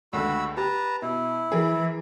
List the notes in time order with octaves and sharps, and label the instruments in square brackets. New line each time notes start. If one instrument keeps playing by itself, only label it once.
[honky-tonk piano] C#2 D3 A3 [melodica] F#4 B5 E6
[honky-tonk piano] G4 [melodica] B4 A5 A#5
[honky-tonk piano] B2 [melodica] E4
[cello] E3 [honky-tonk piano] G#4 A#4